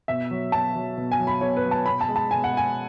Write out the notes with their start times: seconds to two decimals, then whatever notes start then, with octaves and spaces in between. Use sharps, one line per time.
0.08 B2 E5
0.31 F#3
0.52 B2 A5
0.75 F#3
0.98 B2
1.12 G#5
1.19 F#3
1.27 B5
1.41 B2 C#5
1.57 B4
1.64 F#3
1.71 A5
1.86 B2 B5
2.01 A5
2.08 G#3
2.16 A5
2.31 B2 G#5
2.44 F#5
2.52 G#3 G#5